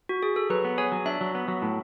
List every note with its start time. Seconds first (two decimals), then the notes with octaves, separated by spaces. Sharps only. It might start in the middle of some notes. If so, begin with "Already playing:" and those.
0.09 F#4
0.23 G#4
0.36 A4
0.50 F#3 B4
0.65 B3
0.78 G#4 C#5
0.92 F#3
1.06 D4 E5
1.21 F#3
1.35 B3
1.48 F#3
1.62 A2